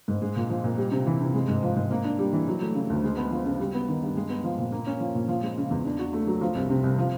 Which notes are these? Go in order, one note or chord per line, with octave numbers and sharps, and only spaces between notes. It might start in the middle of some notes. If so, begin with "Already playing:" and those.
G#2
G#3
A#2
F3
A#2
G3
C3
E3
C3
G#3
G#2
F3
G#2
A#3
D4
G3
E3
F#3
A3
C#3
D2
G#3
B3
F3
C#3
G3
B3
D#3
G2
G#3
B3
F3
A#2
A#3
C#4
F3
A#2
F3
G#3
C#3
E2
D4
F#4
A3
F#3
F3
C2
C3
C2
F3